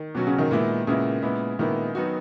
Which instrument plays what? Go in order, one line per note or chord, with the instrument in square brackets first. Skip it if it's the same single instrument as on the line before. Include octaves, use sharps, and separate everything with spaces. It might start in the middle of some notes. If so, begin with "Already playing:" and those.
Already playing: [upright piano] D#3
[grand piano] B2 F#3 C#4 F#4
[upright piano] C#3
D#3
[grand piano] A#2 G#3 B3 E4
[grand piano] A#2 G#3 B3 E4 [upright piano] C#3
[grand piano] A#2 G#3 B3 E4
[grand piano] A#2 G#3 B3 E4 [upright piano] D#3
[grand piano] F#3 B3 D#4 F#4